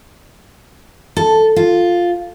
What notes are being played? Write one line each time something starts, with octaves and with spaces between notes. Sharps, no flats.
A4
F4